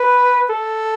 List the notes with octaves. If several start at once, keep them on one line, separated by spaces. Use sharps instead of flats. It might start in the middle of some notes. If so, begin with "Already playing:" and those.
Already playing: B4
A4